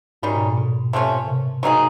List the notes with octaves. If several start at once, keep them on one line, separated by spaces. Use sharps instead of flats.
G#2 D#3 G3 A#3 C#4
B2
A#2
B2
C3 F3 A3 C#4
C3
F#3 A#3 D#4 G#4